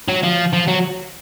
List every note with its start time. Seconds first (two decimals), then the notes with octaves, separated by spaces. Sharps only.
0.09 F#3
0.23 F3
0.53 F3
0.68 F#3